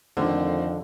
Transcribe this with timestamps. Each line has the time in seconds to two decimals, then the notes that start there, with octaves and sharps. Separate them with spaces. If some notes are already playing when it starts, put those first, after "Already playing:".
0.17 F2 D3 D#3 A3 C4